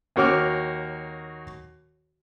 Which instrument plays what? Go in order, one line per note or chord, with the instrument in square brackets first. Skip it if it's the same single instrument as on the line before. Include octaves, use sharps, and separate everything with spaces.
[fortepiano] D#2 A#3 F#4 C#5 D6 F6